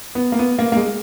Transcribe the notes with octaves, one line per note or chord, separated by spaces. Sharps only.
B3
A#3
B3
A#3
A#3
G#3